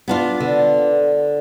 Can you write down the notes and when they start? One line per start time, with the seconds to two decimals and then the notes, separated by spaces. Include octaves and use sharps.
0.08 B3 D4 F4
0.40 D3